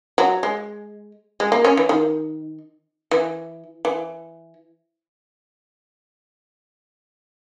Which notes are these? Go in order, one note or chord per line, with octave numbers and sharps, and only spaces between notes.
F#3
G#3
G#3
A#3
C#4
E3
D#3
E3
E3